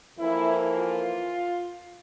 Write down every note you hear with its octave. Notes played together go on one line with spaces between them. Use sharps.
F2 E3 A#3 E4
F4